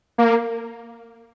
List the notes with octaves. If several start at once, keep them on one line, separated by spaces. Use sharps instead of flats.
A#3